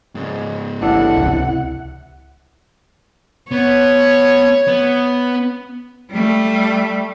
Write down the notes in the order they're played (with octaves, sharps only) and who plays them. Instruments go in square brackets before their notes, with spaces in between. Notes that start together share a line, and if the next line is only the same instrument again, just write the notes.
[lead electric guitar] G#2 C#3
[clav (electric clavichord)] A1 D4 A4 [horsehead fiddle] E4 F#5
[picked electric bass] C#2 C3
[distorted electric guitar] B3 [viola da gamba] C#5
[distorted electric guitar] B3
[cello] G3 A3